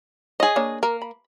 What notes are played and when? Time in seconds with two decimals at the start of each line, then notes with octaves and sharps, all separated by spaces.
0.40 G#4 C#5 D#5
0.56 A#3 D4 C#5
0.83 A#3 A#4
1.02 B5